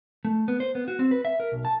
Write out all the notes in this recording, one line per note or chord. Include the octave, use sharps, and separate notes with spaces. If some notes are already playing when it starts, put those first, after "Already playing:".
A3
B3
C5
B3
F#4
C4
B4
E5
A#4
B1
A5